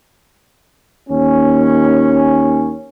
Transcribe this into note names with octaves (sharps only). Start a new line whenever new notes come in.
D#2 C#4